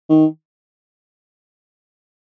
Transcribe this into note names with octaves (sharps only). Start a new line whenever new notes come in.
D#3